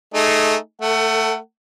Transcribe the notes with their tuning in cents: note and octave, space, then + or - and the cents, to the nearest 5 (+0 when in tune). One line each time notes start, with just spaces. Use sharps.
A3 -10 D#4 +0 G#4 +0
A3 +15 A4 +40 F#5 +25